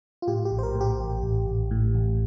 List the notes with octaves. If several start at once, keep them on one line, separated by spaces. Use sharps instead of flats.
F4
A2 G4
G4
A#1
C5
A#4
A2
G4
A1
A1
A1
A2
A1